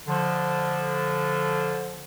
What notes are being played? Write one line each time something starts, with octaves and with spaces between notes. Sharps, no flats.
D3 F3